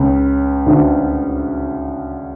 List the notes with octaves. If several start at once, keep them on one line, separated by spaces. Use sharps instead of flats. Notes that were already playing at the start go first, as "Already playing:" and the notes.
Already playing: C#2 C#3
D2 D3